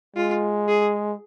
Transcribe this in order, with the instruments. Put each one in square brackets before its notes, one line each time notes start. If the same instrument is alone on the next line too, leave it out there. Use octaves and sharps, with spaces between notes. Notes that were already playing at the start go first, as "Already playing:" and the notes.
[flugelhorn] G#3 [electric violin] F4
[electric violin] G#4